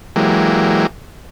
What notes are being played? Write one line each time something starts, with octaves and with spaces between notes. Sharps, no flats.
E3 F#3 G#3 A#3 G4